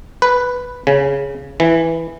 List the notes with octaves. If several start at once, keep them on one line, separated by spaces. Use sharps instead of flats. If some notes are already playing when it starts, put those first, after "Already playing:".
B4
C#3
E3